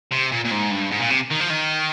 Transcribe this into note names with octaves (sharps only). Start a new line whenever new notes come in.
C3
A#2
A#2
G#2
G2
G#2
A#2
C3
D#3
F3
D#3